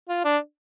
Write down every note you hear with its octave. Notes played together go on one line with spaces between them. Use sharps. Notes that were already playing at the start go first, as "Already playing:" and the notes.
F4
D4